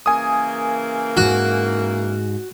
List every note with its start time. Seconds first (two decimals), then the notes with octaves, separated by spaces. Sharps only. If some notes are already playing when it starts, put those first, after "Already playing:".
0.06 C#3 E3 A#3 G#5 D#6
1.17 G#2 F#4